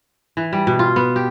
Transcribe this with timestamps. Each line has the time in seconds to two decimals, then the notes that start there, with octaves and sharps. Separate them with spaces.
0.37 E3
0.53 G3
0.67 B2
0.79 F4
0.96 B3
1.16 G4